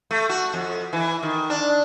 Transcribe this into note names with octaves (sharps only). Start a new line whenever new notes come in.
A3
F#4
F2
E3
D#3
D4